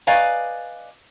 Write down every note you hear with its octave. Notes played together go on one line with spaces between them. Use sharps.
B4 D5 D#5 F5 G#5 A#5